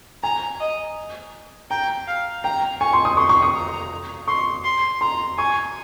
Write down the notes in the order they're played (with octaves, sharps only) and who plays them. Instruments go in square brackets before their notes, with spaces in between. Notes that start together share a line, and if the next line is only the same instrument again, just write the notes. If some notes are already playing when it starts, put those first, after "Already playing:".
[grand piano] G#5 [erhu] A#5
[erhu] D#5
[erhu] G5 [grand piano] A#5
[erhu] F5
[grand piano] G5 [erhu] A#5
[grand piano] G#5 [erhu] C#6
[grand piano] C6
D#6
[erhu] C6 [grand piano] C#6
[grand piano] C#6
D#6
[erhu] A#5
[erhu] C6 [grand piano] C#6
[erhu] C6
[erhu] A#5 [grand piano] C6
[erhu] G#5 [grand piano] C#6